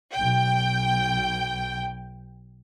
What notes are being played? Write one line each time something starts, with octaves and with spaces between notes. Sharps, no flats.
B1 G5